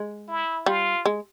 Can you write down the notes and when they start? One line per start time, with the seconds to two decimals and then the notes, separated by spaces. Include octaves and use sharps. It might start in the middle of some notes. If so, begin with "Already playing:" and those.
Already playing: G#3
0.28 E4
0.66 G3 F4
1.06 G#3